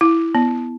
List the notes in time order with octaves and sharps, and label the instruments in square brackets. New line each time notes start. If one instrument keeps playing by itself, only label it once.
[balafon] E4
B3